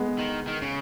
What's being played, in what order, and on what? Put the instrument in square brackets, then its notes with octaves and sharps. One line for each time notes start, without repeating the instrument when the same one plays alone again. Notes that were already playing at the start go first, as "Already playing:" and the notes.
Already playing: [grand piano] G#3 B3
[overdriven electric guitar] D#3
D#3
C#3